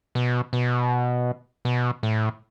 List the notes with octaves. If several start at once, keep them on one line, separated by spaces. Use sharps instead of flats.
B2
B2
B2
A2